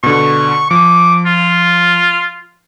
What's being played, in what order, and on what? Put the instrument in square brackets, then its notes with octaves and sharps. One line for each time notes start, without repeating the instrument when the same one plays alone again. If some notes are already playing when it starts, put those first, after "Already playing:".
[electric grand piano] B2 D3 [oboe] C#6
[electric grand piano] F3 [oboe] D6
[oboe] F4